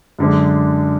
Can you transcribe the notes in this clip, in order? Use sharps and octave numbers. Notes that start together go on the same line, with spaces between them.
F#2 D3 G#3 D4